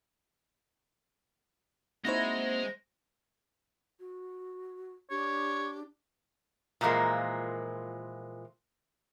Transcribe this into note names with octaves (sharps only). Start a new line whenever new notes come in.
G#3 A#3 C4 D#4 E4 F#4 C5 A#6
F#4
D4 G4 C#5
A#2 E3 F3 G3 G#3 A#3